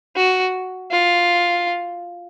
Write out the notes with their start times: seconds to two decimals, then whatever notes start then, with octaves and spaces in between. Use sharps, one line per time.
0.16 F#4
0.91 F4